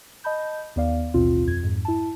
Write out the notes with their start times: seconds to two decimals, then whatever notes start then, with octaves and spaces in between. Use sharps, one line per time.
0.24 D#5 A5 B5 G6
0.76 D#2 B3 D5 F5
1.14 A1 D#2 B2 C4 F4
1.47 F2 G#6
1.63 F2 G#2
1.85 E4 A5